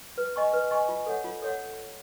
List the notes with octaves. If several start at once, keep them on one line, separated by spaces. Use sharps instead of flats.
B4
D#5 G#5 C#6
B4
D#5 G#5 C#6
F4
A4 C#5 F#5
F4
A4 C#5 F#5